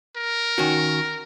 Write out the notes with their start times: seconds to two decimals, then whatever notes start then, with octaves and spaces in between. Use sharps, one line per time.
0.17 A#4
0.58 D#3 C#4 F#4